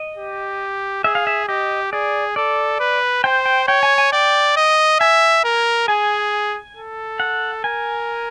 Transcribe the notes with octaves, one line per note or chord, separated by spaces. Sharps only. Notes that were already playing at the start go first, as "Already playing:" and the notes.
Already playing: D#5
G4
G#4 E5
F5
E5
G4 D#5
G#4 D5
A4 D5
B4
C5 G5
G5
C#5 G5
G#5
G#5
D5 G5
D#5
E5 G#5
A#4
G#4 G#5
A4
F#5
A#4 G#5